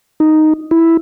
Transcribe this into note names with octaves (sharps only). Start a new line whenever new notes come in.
D#4
E4